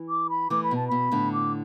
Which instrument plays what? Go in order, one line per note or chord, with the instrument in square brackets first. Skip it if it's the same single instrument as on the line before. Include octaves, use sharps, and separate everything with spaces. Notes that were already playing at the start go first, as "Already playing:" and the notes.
Already playing: [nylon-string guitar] E3
[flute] D6
B5
[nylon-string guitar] E3 A3 [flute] D6
[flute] B5
[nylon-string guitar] B2 [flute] A5
[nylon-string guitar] B2 [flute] B5
[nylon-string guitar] A2 D3
[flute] D6